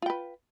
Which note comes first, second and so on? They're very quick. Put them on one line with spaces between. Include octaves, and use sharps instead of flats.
F4 G5 B4